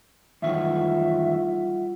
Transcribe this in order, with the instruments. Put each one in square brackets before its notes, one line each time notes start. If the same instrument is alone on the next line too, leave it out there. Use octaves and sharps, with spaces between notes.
[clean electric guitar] F#2 D#3 E3 [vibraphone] G3 F4 F#5 [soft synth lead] E5